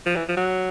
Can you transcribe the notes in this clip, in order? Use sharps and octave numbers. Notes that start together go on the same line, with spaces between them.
F3
E3
F3
F#3